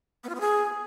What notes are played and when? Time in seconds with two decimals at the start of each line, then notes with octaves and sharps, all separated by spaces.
0.24 B3
0.29 F4
0.35 B3
0.40 G#4